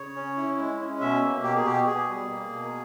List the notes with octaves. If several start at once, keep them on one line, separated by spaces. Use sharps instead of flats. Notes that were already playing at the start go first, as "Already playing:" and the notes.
Already playing: C#3 C#5
C#4
E4
G#3
C#4
B2 E5
A#3
B2 G4
G#4
B2 G4
B2 G#4
G3
A#3
B2